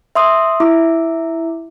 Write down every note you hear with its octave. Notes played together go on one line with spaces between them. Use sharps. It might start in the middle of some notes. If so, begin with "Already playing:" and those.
E5 C6 D#6
E4 E5 D6